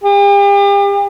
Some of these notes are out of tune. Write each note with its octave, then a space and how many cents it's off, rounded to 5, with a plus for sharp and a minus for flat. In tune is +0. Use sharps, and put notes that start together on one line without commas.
G4 +40